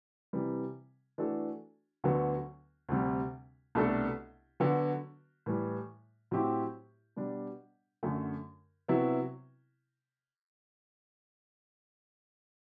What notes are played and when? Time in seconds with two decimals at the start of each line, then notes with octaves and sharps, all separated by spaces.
0.33 C3 E3 G3
1.18 E3 A3 D4 F#4 A4
2.04 D2 D3 F#3 B3
2.89 D2 C3 G3
3.75 C2 B2 A3 D4 A4
4.60 D3 F#3 B3 F#4
5.46 A2 E3 G3
6.31 A2 F#3 C4 E4 G4
7.16 B2 G3 D4
8.03 F#2 D3 A3
8.88 C3 F#3 B3 E4